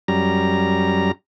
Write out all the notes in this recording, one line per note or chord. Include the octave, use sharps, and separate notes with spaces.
F#2 G3 A#5